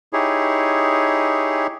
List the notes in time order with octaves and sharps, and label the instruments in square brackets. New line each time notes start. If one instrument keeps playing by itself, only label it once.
[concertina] D#4 E4 G4 G#4 C#5